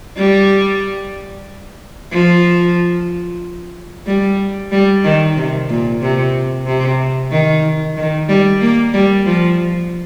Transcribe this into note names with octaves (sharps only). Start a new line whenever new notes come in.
G3
F3
G3
G3
D#3
C3
A#2
C3
C3
D#3
D#3
G3
A#3
G3
F3